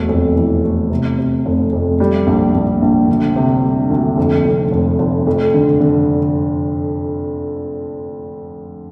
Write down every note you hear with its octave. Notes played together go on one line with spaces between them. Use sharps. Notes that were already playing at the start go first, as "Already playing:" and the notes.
Already playing: E1 A3
F2
E3
A3
C3
C3
F1
F2
G3
A#1
A#1
A#1
D2
C3
G3
D2
F2
F1
F1
F1
F2
D3
D3